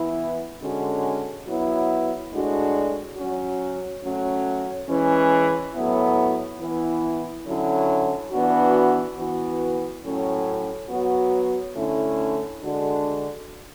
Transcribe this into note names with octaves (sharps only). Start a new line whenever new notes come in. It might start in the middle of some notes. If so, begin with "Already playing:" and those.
Already playing: E3 B3 E4
D3 G#3 C#4 F#4
F#3 B3 E4
A2 G#3 D4 F#4
F#3 C#4 F#4
F#3 A3 C#4
E3 G#3 C#4
A2 F#3 B3 E4
E3 B3 E4
D3 F#3 C#4 E4
E3 B3 D4 F#4
E3 B3 F#4
A2 F#3 C#4
F#3 B3 F#4
D3 A3 C#4 E4
D3 G#3 D4 F#4